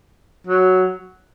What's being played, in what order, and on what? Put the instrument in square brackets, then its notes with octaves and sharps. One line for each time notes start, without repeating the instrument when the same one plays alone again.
[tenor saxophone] F#3